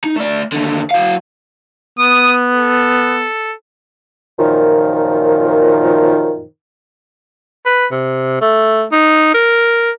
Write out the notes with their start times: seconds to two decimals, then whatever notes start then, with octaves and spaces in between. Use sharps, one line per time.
0.04 D#4
0.16 A3 D5
0.53 D#2 D3
0.91 F#3 F5
1.99 B3 D#6
2.53 A4
4.39 F#2 A#2 D#3 F3
7.66 B4
7.91 C3
8.41 A3
8.92 D#4
9.34 A#4